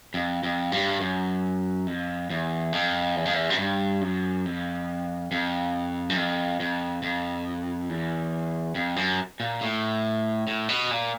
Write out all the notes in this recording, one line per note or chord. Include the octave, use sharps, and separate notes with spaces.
F2
F2
G2
F#2
F2
E2
F2
E2
F2
E2
F#2
G2
F#2
F2
F2
F#2
F2
F2
F2
E2
F2
F#2
A#2
A2
A2
B2
A#2